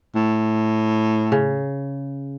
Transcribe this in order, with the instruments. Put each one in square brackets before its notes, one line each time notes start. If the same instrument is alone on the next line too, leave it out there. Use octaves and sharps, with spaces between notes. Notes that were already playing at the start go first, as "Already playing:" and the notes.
[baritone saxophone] A2
[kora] C#3